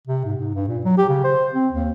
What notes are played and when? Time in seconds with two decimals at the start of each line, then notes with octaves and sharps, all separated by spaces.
0.07 C3
0.24 G#2
0.38 G#2
0.55 G2
0.68 A#2
0.85 F#3
0.98 G4
1.09 C#3
1.24 C5
1.54 C4
1.72 D#2